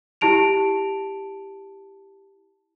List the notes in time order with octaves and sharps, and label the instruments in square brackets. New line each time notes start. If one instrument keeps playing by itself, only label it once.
[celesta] E4 G4 A5 D7 F7